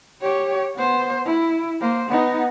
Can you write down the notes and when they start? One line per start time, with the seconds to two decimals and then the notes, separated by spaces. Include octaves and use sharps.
0.21 G4 C#5
0.75 B3 C5
1.26 E4
1.81 A#3 C5
2.10 B3 D#4